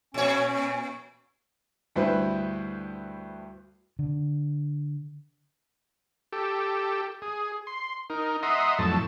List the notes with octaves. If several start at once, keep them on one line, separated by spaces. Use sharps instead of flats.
A#2 C#4 C#5
D2 G2 E4 B4 C5
D3
G4 A4
G#4
C6
D#4 A#4
D#5 E5 F#5 A#5 C6 D#6
F2 A2 F#3 A4 A5